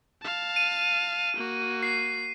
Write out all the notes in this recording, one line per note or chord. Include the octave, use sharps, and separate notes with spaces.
F5 A5
D#7
A#3 F#4
C7